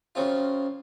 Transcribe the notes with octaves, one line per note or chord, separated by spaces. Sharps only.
F#2 C#3 C4 F4